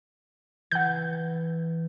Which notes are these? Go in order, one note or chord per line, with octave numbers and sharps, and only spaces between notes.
E3 F#5 G6